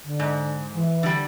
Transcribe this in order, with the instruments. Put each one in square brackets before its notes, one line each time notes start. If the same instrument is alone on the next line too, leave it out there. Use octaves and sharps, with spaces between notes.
[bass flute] D3
[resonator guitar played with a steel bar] G#2
[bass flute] E3
[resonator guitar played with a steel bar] D3 G3